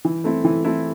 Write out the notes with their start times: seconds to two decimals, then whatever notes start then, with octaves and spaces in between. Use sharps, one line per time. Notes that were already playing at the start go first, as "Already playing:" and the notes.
0.05 E3
0.24 A3 C4 E4
0.44 E3
0.64 A3 C4 E4